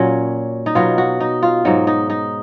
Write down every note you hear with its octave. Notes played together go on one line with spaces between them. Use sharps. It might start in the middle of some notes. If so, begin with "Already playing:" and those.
Already playing: A#2 F#3 C#4
D#4
B2 F#3 F4
F#4
D#4
F4
G#2 F#3 D#4
D#4
D#4